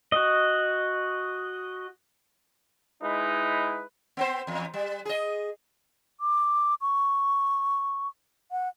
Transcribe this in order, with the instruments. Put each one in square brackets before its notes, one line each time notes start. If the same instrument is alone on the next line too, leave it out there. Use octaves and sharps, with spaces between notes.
[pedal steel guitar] F#4 D#5
[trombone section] G#3 D#4 E4 B4
[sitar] B3 C4 C5
E2
G3
G#4 D#5
[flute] D6
C#6
F#5